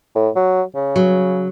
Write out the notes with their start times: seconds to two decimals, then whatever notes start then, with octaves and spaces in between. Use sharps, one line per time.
0.15 A2
0.35 F#3
0.75 C#3
0.96 F#3